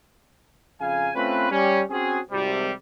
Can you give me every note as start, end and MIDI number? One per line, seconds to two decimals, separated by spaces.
0.80 1.09 41
0.80 1.09 49
0.80 1.09 77
0.80 1.09 80
1.15 1.47 57
1.15 1.47 60
1.15 1.47 61
1.15 1.47 65
1.15 1.47 71
1.50 1.82 55
1.50 1.82 61
1.90 2.19 60
1.90 2.19 61
1.90 2.19 66
1.90 2.19 68
2.31 2.71 32
2.31 2.71 48
2.31 2.71 55